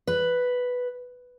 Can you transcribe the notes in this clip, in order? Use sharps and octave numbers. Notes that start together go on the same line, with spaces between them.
B4